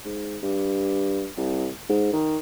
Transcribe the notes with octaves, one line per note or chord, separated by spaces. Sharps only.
G#2
G2
C2
G#2
D#3